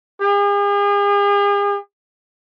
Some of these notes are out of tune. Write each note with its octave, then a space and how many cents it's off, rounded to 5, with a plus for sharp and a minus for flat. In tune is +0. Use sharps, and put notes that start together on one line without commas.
G#4 -45